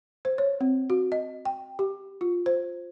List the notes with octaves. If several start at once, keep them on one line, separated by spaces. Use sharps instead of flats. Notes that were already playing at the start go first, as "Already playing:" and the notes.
C5
C#5
C4
F#4
D#5
G5
G4
F4
C5